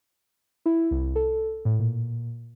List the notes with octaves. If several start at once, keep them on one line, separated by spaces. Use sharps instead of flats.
E4
C2
A4
A2
A#2